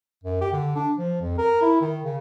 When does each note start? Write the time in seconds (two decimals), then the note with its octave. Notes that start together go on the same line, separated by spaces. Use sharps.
0.24 F#2
0.41 G4
0.53 D3
0.76 D4
0.97 F3
1.21 F2
1.38 A#4
1.62 E4
1.81 D#3
2.04 C#3